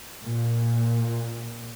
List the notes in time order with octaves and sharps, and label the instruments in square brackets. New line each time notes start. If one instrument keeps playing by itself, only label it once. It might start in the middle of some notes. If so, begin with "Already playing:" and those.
[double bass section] A#2